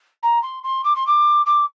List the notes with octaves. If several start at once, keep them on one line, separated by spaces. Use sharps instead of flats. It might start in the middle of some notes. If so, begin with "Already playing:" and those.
A#5
C6
C6
D6
C6
D6
D6